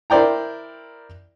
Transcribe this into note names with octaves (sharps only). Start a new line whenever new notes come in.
E4 A#4 C5 D5 G5 A#5